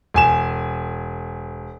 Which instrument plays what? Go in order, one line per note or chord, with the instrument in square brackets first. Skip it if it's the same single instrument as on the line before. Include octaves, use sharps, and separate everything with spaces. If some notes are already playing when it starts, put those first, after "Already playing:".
[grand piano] E1 G#5 E7